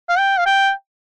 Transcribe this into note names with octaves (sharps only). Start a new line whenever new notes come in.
F5
G5
F5
G5